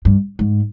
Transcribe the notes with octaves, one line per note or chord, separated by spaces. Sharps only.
G2
G#2